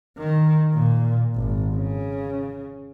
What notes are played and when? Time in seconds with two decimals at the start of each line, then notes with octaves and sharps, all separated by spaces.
0.18 D#3
0.73 A#2
1.35 G#1
1.73 C#3